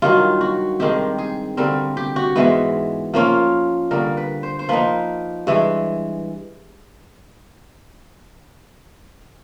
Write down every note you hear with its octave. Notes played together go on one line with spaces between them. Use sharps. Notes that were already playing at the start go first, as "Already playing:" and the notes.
G2 D#3 F#3 F4
F#4
G2 D#3 G#3 C4 G4
G#4
G2 D3 G3 C4 A#4
G4
F#4
G#2 E3 G#3 B3
F3 A#3 C#4 F4
G2 D3 G3 A#3 A#4
B4
C5
C5
F3 A#3 D#4 B4
G2 E3 G#3